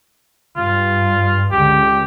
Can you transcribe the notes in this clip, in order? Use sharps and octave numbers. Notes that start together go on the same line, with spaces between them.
G2 F4
C#2 D3 G4